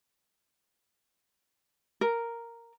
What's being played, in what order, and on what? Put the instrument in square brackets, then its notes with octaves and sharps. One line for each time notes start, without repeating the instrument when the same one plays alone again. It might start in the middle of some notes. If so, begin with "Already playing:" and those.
[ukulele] A#4